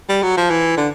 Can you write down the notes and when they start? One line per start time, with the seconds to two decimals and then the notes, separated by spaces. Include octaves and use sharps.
0.09 G3
0.23 F#3
0.37 F3
0.50 E3
0.77 D3